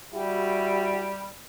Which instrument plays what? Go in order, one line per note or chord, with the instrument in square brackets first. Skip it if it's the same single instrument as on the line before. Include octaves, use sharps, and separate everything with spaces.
[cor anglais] G3 [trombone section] E4 F#4 G4